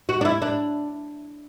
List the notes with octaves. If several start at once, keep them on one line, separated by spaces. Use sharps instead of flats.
F#4
D4
E4
D4